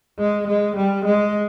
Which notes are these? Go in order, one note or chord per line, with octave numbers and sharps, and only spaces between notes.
G#3
G#3
G3
G#3